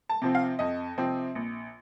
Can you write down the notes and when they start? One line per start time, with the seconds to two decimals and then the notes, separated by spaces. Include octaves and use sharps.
0.09 A5
0.22 C3 F3 C4
0.35 F5
0.59 F2 D#5
0.98 C3 F3 C4
1.35 A#1